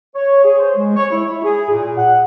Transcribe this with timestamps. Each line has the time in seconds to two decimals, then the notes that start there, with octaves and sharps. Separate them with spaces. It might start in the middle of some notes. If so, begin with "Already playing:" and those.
0.15 C#5
0.44 G#4
0.58 C5
0.76 G#3
0.95 C#5
1.10 E4
1.29 E4
1.44 G#4
1.69 A#2
1.97 F#5